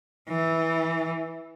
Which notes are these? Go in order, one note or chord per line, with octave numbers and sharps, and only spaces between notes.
E3